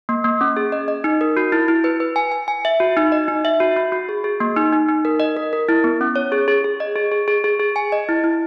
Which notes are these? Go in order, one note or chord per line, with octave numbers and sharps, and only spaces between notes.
A#3
A#3
C#4
G#4
D#5
D#5
D#4
A#4
F#4
E4
E4
B4
B4
G#5
G#5
G#5
E5
F#4
D#4
D#5
D#4
E5
F#4
F#4
F#4
G#4
G#4
A#3
D#4
D#4
D#4
A#4
D#5
A#4
A#4
E4
B3
C#4
C#5
G#4
G#4
G#4
D#5
G#4
G#4
G#4
G#4
G#4
G#5
D#5
E4
E4